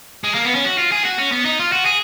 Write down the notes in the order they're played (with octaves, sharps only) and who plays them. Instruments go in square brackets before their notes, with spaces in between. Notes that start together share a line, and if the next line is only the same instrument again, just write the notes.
[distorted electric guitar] G#3
A#3
B3
C#4
F#4
F4
G#4
F#4
C#4
B3
D#4
F4
F#4
G#4